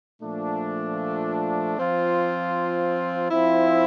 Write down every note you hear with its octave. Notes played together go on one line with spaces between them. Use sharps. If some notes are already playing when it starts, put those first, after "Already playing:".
A#2 F3 A3 D4
F3 C4 F4
F3 C4 E4